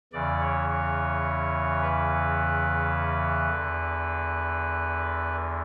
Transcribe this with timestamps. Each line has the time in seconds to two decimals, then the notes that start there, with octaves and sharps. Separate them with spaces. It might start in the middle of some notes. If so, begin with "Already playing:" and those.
0.13 E2 C#3 E3 D5
0.41 C#5
0.69 C#5
1.82 B4
3.50 E2 D3